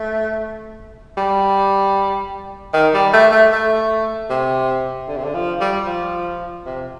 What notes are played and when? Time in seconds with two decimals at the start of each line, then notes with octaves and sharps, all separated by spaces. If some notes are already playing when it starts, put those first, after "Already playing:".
Already playing: A3
1.17 G3
2.74 D#3
2.94 G3
3.13 A3
3.32 A3
3.52 A3
4.30 C3
5.08 D3
5.17 C3
5.24 D3
5.34 F3
5.61 G3
5.86 F3
6.66 C3